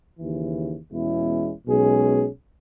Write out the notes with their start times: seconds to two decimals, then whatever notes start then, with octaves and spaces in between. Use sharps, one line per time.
0.17 D#2 C#3 E3
0.92 E2 B2 G#3 C#4 E4
1.67 B1 B2 G#3 C#4 G#4